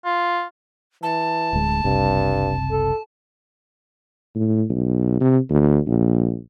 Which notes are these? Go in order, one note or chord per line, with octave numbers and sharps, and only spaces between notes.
F4
E3 A5
D1 D2 G#3
F#1 C2 G2 C3
A4
A2
B1
C3
D2
A#1